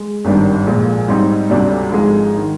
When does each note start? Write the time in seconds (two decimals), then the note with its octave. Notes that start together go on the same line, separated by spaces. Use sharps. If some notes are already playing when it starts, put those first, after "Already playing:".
Already playing: G#3
0.25 G#1 G2 D#3 G3 D4
0.67 A#1 A#2 G#3
1.08 G#2 G3 C4 D#4
1.50 D2 C3 G3 D4
1.92 G#1 G#2 F3 G#3
2.37 D#3